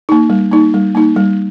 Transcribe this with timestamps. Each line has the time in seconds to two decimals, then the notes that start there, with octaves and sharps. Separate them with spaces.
0.09 A#3 D#4
0.30 G3
0.51 A#3 D#4
0.74 G3
0.95 A#3 D#4
1.16 G3